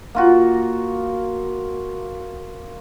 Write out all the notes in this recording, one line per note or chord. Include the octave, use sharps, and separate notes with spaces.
A#3 F4 F#4